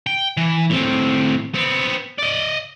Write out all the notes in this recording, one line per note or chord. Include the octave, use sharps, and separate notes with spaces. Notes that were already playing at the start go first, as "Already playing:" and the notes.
G5
E3
A2 C4
B3 C4
D5 D#5